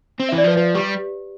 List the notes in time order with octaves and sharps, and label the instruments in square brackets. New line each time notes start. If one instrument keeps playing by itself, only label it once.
[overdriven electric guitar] C4
[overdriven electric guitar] E3 [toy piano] E5
[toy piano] D5
[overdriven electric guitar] F3 [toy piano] B4
[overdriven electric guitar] F3 [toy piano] B4
[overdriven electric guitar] G3 [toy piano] G4